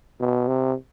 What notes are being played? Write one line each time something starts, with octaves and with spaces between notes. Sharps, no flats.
B2
C3